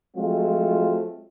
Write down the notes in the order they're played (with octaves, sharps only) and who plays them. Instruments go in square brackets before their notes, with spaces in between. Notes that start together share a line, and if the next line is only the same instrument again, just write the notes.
[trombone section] F3 F#3 G#3 A3 C4 F4